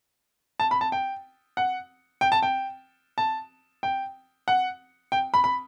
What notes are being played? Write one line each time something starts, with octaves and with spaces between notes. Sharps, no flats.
A5
B5
A5
G5
F#5
G5
A5
G5
A5
G5
F#5
G5
B5
B5